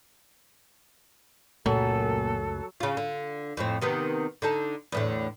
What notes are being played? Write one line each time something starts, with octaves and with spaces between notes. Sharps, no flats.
C#2 F#2 A#2 F#3 A3 A4
C#3 F4
D3
F2 A2 C4
C3 D#3 B3
D3 D#4 A4
E2 A2 D3